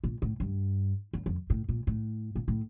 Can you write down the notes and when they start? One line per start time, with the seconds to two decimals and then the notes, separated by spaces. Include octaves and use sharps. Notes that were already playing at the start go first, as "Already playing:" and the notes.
0.04 A#2
0.22 A2
0.40 G2
1.13 E2
1.26 F2
1.50 A2
1.69 A#2
1.87 A2
2.35 A#2
2.48 A2